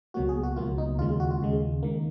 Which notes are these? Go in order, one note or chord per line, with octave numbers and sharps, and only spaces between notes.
C#2 B2 F#3 A#3 F#4
G#4
F#4
C#2 B2 F#3 A#3 F4
D#4
D#2 C#3 G#3 F4
F4
F#4
F4
D#2 C#3 G#3
D#3 A#3